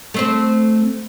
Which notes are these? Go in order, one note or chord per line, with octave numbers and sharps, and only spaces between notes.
A3 C4 C5